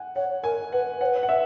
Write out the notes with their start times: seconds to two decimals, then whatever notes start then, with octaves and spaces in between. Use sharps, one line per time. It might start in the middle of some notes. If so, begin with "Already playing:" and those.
Already playing: F#5 G#5
0.16 C#5 F#5
0.44 A#4 G#5
0.72 B4 F#5
1.01 C#5 F#5
1.06 B4
1.23 F#5
1.29 E5